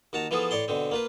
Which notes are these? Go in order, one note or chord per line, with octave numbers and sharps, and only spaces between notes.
D#2 F#4 A5 A#5
E3 F3 B3 G#4 A4
A2 C#5 D5 C6
B2 D3 C4
A#3 F4 B4